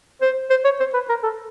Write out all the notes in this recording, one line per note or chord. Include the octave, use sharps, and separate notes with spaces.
C5
C5
C#5
C5
B4
A#4
A4